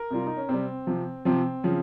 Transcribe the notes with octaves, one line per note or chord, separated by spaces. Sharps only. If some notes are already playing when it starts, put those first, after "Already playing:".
Already playing: A#4
C3 G3 F4
D#4
C#4
C3 G3 C4
C3 F3
C3 F3 C4
C#3 F3